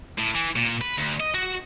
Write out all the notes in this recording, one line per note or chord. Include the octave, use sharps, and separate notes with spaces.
A2
E3
A#2
B4
D2
D#5
F#4